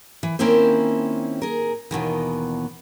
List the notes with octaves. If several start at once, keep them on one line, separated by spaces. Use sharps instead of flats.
E3
D#3 A#3 C4 C#4 E4 C5
G#4 A#4
D#2 B2 D#3 E3